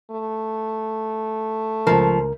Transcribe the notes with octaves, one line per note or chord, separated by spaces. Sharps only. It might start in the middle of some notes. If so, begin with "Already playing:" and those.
A3
C#2 F3 A#4